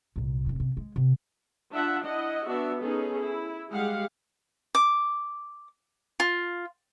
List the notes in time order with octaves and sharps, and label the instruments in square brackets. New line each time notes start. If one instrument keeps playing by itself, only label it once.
[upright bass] C2 A#2
F1 A2
C3
G#3
C3
[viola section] D4 F4 E5 F#5
E4 D#5 F#5
B3 D4 F#4 E5
B3 C#4 D#4 G#4 A4
E4
G3 G#3 G4 G#4 F5 F#5
[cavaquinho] D6
F4